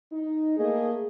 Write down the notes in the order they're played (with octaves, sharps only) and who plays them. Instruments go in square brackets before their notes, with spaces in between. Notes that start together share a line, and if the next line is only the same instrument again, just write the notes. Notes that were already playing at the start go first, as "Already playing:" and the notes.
[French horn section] D#4
[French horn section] A3 A#3 D#5 [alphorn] G#4